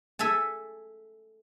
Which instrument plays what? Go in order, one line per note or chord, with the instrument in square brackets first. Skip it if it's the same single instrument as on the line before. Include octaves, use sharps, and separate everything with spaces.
[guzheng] A4 E5 G#5 A5